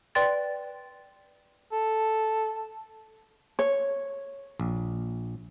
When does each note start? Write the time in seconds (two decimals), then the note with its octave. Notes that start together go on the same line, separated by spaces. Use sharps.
0.15 B4 D5 G5 C6 A6
1.72 A4
3.59 C#5
4.60 A#1